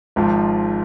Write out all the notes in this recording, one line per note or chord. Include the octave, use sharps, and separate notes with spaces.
G#1 G#2 F3